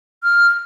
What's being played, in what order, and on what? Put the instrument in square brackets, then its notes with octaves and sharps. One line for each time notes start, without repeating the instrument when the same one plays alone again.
[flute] F6